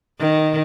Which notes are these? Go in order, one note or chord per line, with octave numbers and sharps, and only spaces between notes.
D#3